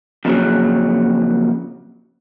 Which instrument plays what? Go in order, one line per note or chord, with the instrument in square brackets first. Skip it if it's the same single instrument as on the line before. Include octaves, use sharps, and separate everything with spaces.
[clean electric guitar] F2 A#2 C#3 F#3